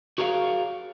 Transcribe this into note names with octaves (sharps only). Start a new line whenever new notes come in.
F#4 G#4 A#4 C#5 D#5 F5